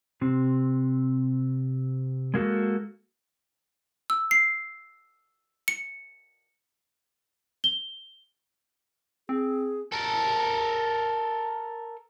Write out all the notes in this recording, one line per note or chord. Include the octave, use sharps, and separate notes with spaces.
C3 C4
G#3 A#3 F#4 A4
E6
C7
C#7
G7
C4 G#4
A4 A#4